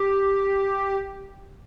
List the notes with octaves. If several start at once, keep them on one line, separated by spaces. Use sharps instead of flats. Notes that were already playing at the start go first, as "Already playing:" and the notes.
Already playing: G4